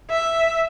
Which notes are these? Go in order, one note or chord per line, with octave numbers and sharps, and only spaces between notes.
E5